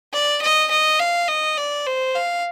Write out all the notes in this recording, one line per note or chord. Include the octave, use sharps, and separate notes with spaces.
D5
D#5
D#5
F5
D#5
D5
C5
F5